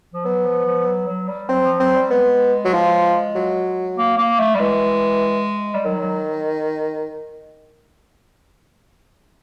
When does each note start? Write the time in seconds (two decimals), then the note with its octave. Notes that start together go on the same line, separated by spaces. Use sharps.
0.13 F3
0.25 F#3 B3
0.45 F3
0.66 F3
0.86 F#3
1.07 F#3
1.28 G3
1.49 F#3 C4
1.64 F3
1.80 F#3 C4
1.96 G3
2.10 G#3 B3
2.65 F#3
2.73 F3
3.35 F#3
3.98 A#3
4.18 A#3
4.40 A3
4.55 G3
4.59 E3 G#3
5.75 G3
5.85 D#3 F#3
6.00 F#3